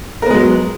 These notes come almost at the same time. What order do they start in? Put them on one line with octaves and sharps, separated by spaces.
A#4 B3 G#3 F#3